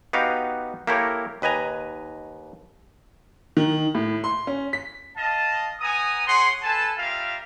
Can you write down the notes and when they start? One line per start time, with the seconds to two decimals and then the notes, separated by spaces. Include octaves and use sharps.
0.13 B3 D#4 F#4 G4 F5
0.87 A#3 E4 G4 A4 A#4 C#5
1.42 D#2 B4 D#5 G#5 A#5
3.57 D#3
3.95 A2
4.24 C6
4.47 C#4
4.73 B6
5.15 D#5 F5 A5
5.80 B3 G#5 A#5 D#6
6.27 G#4 C#5 F#5 C6
6.63 A4 B4 G#5 A5
6.97 G3 F4 A#4 E5 F5